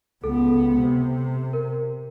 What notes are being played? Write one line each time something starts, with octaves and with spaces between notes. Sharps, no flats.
C#2 B3 A4
C3
A#4